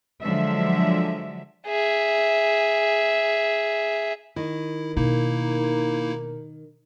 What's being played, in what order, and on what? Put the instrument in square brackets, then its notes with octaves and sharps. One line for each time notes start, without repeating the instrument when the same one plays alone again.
[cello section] D3 F3 F#3 G#3 E5
[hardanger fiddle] G#4 E5
[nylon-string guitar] D#3 [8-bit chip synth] E4
[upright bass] B2 [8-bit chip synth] A#3 D#4 E4 [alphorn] A#4